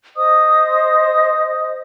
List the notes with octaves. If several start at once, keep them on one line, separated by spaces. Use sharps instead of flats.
C5 D#5 D#6